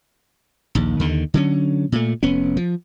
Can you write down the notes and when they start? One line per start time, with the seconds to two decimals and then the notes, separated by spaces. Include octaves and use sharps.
0.75 A#1 D#2
1.00 D#2 D3 D#3
1.34 D3 F#3 C#4
1.92 A#2 A3
2.23 F1 B3 C#4
2.57 F3